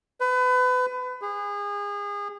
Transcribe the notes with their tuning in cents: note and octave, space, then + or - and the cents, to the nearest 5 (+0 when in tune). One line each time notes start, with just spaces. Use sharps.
B4 +30
G#4 -30